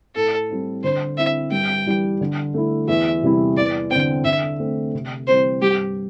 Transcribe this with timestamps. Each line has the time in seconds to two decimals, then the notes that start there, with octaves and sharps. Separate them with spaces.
0.15 A2 A4
0.49 G3 C4 E4
0.83 D3 C5
1.17 C4 E4 E5
1.51 G2 G5
1.86 E3 G3
2.21 D3
2.54 A3 E4
2.88 E2 E5
3.23 C3 G3 E4
3.57 E2 D5
3.90 D3 C4 G5
4.24 D3 E5
4.60 A3 C4
4.94 C3
5.27 E3 G3 C4 C5
5.62 G2 G4